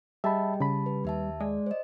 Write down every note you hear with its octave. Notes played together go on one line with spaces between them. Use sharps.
G3 G#4 D#5 E5 G5 A5 B5
C#3 A5 B5
B4
D#2 G4 E5 A5
G#3 D5
C5 D#5